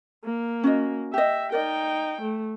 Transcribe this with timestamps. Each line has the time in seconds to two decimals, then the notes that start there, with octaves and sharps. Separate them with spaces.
0.25 A#3
0.64 C#4 F#4 D#5
1.14 G4 D#5 E5
1.52 D#4 A#4 D5 D#5 G5
2.22 A3